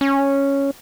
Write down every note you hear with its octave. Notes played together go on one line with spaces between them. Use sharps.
C#4